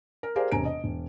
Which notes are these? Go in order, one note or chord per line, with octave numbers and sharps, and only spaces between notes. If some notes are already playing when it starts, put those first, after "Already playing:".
A#4
G4 G#4 A#4 C5 D5 F5
E1 C3 G#5 A#5 D7
D#5
E1